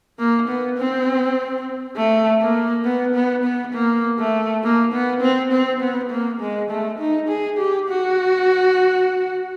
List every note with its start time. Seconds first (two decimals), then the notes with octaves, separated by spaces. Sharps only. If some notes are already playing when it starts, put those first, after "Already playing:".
0.19 A#3
0.48 B3
0.78 C4
1.96 A3
2.40 A#3
2.84 B3
3.15 B3
3.44 B3
3.73 A#3
4.19 A3
4.63 A#3
4.92 B3
5.21 C4
5.52 C4
5.80 B3
6.10 A#3
6.41 G#3
6.70 A3
6.99 D#4
7.28 G#4
7.58 G4
7.89 F#4